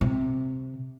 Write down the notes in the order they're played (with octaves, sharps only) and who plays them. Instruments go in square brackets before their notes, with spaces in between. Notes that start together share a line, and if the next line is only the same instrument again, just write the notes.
[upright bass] C3